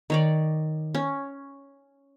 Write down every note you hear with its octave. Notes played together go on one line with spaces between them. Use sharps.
D#3 C#5 D5
C#4